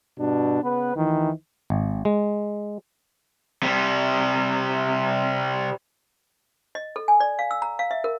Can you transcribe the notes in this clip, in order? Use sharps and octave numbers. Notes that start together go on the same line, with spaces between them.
G2 B2 D4
C#3 B3 B4
D2 D#3 E3
G#1
G#3
C3 G3
D#5
A4
G#5
D5
F5
E6
A#5
F5
E5
A#4